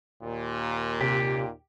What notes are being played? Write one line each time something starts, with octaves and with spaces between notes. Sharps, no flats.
D#2 A#2
C3 G4